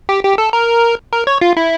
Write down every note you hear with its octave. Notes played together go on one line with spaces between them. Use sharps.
G4
G4
A4
A#4
A#4
C#5
F4
E4